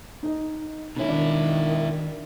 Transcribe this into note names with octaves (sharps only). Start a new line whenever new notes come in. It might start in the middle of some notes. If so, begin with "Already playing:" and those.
D#4 D#5
B2 D#3 C#4 E4
D#3 D4